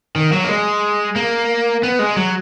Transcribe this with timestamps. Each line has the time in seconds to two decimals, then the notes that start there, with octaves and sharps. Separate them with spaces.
0.16 D#3
0.32 F#3
0.44 A#3
0.49 G#3
1.16 A#3
1.83 B3
1.99 G#3
2.16 F#3